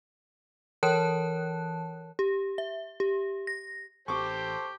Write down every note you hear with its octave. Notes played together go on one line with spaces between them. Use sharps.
E3 A#4 C#5 A5 F#6
G4
E5
G4
A#6
A1 G4 A4 C5 C#6 D6